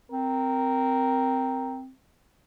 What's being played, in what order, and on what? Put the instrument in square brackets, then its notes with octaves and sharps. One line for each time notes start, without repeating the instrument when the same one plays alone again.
[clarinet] C4 [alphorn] A#4